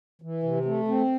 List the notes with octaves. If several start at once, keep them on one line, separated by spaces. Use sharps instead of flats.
E3
C3
A3
C4